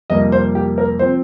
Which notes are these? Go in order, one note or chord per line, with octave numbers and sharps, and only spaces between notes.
F2 C3 G3 A#3 D#5
C5
G4
A#4
F3 C4 C5